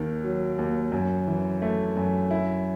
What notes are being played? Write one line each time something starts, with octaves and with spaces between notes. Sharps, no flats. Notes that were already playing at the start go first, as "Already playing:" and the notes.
Already playing: D#2 D#3
F#3
D#2
F#2
E3
A3
F#2
E4